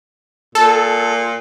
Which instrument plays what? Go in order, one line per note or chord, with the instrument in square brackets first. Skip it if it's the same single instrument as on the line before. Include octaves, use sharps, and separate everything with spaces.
[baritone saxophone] A#2 [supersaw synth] A4